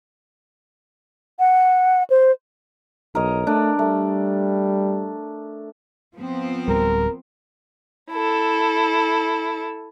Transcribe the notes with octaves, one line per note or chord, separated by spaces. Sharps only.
F#5
C5
B1 A#4 C#5 D#5
A3 D4
G3 A3
F3 B3 C4
D1 G3 A#4
E4 A4